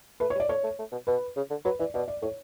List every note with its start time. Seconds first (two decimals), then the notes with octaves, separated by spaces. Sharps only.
0.20 A3 B4
0.30 C#5
0.35 G3
0.40 D5
0.49 A3 C#5
0.64 A3
0.79 A3
0.92 B2
1.07 B2 B4
1.36 C#3
1.50 D3
1.65 F#3 B4
1.79 E3 D5
1.94 B2 D5
2.08 D5
2.22 A2 C#5